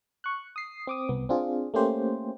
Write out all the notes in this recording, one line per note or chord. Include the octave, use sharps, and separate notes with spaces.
C#6 F#6
D#6 C7
C4 D6 D#6
C2 B3
C4 D4 F4 G#4
A3 A#3 C#4 G4 C5